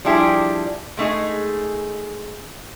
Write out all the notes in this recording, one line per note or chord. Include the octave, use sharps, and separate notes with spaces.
F3 G3 D4 E4 G4 G#4
G#3 A3 D#4 G#4